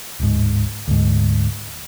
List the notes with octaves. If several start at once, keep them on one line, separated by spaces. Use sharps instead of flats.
D1 G#2
D2 G#2